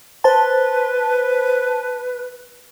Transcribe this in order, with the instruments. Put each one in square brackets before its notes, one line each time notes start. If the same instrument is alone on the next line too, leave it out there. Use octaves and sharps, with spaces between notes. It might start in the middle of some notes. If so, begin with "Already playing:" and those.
[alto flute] B4 [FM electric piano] C5 A5